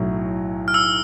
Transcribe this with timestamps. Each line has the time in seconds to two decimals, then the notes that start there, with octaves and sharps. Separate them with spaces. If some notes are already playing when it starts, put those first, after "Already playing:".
Already playing: B1 A2 F#3
0.68 F6
0.74 E6